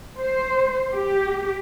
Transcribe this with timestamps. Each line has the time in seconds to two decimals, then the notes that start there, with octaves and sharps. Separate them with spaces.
0.21 C5
0.95 G4